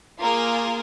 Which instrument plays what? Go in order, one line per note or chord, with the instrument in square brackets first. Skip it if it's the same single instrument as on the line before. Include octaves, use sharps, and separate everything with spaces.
[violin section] A#3 F4 G#4 A#4